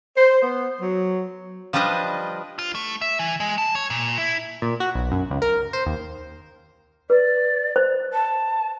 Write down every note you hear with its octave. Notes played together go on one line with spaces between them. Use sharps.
C5
B3
F#3
F3 G3 D4 B4 D#5
F4
A3
E5
E3
G#3
A5
C#5
A#2
E4
A#2
F#4
B1
F#2
C#2
A#4
C5
D#2
B4 D5
C5
A5